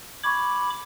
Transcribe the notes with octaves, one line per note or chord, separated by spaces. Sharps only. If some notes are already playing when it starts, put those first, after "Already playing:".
B5 C#6 D6 G#6